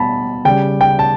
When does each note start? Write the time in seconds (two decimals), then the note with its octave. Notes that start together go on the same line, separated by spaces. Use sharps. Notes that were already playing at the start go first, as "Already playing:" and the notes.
Already playing: B2 G3 A5 B5
0.45 C#3 G3 G5
0.81 G5
0.99 A5